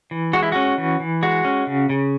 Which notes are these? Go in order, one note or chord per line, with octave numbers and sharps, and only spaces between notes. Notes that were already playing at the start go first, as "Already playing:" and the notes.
E3
G#3 F#4
E4
C#4 F#4
E3
E3
G#3 F#4
C#4
C#3
C#3